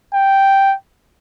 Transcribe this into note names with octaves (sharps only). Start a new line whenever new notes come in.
G5